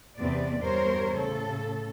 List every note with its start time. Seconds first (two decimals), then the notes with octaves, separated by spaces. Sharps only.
0.19 E2 C3 C4 B4 D5
0.58 E2 G2 G3 A#4 C5 C#5
1.15 A2 C#3 A4